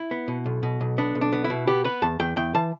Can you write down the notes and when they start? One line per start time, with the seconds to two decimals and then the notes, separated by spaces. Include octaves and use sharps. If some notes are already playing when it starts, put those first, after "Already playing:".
Already playing: E4
0.11 B3
0.28 B2
0.46 B1
0.63 B2
0.81 B1
0.98 B3 D4
1.15 B1
1.21 D4
1.33 B3
1.44 E4
1.50 B2
1.67 B3 G4
1.84 B3 B4
2.02 E2 A5
2.20 E2 G5
2.37 E2 G5
2.55 E3 A5